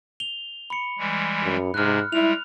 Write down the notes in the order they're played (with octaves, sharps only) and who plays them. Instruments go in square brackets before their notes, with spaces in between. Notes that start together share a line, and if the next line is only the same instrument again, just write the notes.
[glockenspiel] F7 G7
B5 C#7
[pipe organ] E3 G3 G#3
[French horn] F#2
[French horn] G#2 [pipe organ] C3 G#3 [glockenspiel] F6 F#6
[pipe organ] G3 G#3 [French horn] E4 [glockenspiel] F7